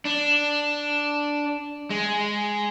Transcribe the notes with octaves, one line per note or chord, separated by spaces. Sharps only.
D4
G#3